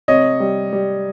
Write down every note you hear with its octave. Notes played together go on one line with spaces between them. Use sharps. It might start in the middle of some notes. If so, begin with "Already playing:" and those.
C3 C#5 D#5
G3
G3